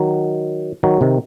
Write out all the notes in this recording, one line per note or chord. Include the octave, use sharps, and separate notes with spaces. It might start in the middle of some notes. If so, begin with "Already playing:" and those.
Already playing: D#3 F#3
D#3 F#3
C3 D#3